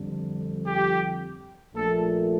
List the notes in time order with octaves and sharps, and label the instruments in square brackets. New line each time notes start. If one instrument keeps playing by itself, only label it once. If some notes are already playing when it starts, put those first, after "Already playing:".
Already playing: [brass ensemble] F2 D3 G3
G4
A#1 A#2 A3 A4